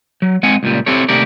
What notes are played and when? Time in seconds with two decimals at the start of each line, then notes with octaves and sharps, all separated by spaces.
0.22 F#3
0.43 G#3 C4 F#5 G#5
0.63 C#2 A#2 G3
0.86 C4 E4 G4 A4 C#5
1.09 D#2 C3 A3 G4 A#4 D5